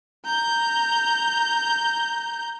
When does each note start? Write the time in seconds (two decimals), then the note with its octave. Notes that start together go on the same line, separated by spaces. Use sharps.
0.25 A#5 G6